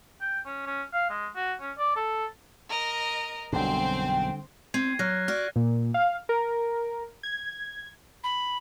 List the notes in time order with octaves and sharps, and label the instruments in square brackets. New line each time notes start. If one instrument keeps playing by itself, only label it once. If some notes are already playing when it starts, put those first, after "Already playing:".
[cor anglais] G5
C#4
C#4
F5
G#3
F#4
C#4
D5
A4
[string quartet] A#4 D#5
[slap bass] B1 F#2 [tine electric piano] D3 G3 [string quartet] C4 C5 [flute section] G5
[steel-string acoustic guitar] C4 [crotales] G#6 C7 D#7
[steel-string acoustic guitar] F#3 [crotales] F6 F#6 A#6
[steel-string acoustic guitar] F#4 D5 [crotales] F6
[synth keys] A#2
F5
A#4
G#6
[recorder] B5